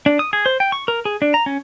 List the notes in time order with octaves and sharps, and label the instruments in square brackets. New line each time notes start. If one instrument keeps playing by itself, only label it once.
[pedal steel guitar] D4
D#6
G#4
C5
G5
C#6
A#4
G#4
D4
A#5
C#4